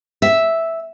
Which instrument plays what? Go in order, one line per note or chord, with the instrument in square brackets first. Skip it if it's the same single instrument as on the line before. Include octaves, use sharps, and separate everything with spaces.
[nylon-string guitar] E5